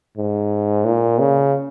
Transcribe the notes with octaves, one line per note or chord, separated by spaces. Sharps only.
G#2
A#2
C#3